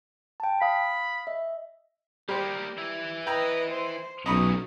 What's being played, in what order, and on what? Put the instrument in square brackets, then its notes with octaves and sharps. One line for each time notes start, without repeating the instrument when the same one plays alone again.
[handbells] G5 A5
[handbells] F5 D#6 [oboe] B5
[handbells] D#5 E5
[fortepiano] G3 C5 [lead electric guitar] A#3 G4
[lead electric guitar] E3 E4
[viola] B4 D#5 [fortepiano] G5 A#5
[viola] C5
[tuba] B1 [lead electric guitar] A#2 F#3 [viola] C#4 [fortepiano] D#5 B5 D#6